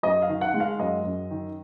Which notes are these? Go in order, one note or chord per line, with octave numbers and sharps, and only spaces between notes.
F#2 D#5
F5
D#3
F#5
G#3
F5
F#2 D#5
F#2
D#3